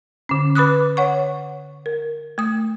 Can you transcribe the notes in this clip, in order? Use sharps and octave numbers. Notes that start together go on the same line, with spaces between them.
D3 C#4
B4 B5 D6 D#6 F#6
C#5 F#5 C#6
A#4
A3 D#6